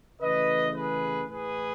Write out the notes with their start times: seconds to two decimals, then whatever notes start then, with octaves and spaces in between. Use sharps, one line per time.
0.21 C#3 E3 A3 B4 D#5
0.75 G#4 B4
1.29 A2 E3 A3 G#4 B4